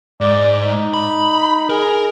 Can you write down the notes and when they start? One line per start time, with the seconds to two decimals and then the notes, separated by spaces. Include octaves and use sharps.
0.21 G#2 D5
0.61 D#4
0.94 B5
1.70 G#4 A#4